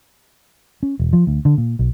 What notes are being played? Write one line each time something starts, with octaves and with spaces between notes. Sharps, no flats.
C#4
E1
F3
D2
D3
A#2
B1